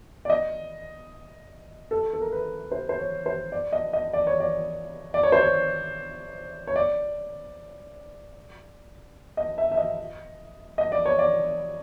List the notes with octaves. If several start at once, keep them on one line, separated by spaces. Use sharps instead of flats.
D5
D#5
A4
A4
A#4
B4
C5
C5
C#5
C5
D5
D#5
D#5
D5
C#5
D5
D5
C#5
C5
C#5
C#5
D5
D#5
E5
E5
D#5
D#5
D5
C#5
D5